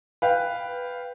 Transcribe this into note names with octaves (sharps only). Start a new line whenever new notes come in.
B4 F5 G5